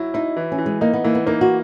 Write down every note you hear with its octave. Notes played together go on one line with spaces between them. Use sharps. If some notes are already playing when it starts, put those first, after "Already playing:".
Already playing: F#3 E4
D#4 E4
E3
C#4
E3
G#3
A#3 D#4
B3
E3 A#3
B3
A#3 D#4
F#4